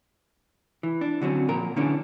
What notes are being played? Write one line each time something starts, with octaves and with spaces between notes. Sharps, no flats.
E3
D4
D3 F#3 C4 C#4
A#2 F3 A#4
D3 E3 C#4 D4